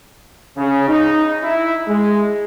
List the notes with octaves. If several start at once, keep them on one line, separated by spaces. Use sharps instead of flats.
C#3
D#4
E4
G#3